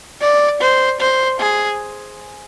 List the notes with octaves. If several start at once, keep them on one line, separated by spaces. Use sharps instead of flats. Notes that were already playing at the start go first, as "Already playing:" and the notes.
D5
C5
C5
G#4